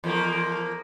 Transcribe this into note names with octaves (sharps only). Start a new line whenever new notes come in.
E2 F3 A#3